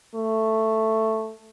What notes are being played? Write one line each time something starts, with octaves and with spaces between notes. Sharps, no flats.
A3